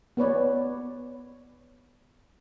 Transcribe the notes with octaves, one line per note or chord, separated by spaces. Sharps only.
B3 B4 C#5 D5